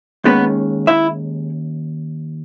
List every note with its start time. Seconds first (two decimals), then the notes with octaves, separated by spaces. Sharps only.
0.24 D#2 D#3 G#3 B3 C#4 B4
0.87 E4 E5